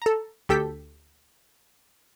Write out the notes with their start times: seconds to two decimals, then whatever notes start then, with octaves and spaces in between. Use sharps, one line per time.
0.02 A4 A#5
0.49 D2 G4 A4 G6 B6